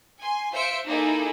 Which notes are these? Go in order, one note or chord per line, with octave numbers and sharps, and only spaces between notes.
G#5 C6
F4 C5 E5 G6 C#7 D7
A#3 D#4 E4 G#4 A4